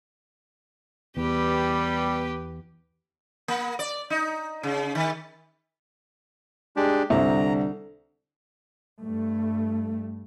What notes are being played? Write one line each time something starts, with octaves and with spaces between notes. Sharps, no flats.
E2 G3 B3 G4 B4
A#3
D5
D#4
C#3
D#3
G#3 D4 G4
C2 D3 A#5
G2 A3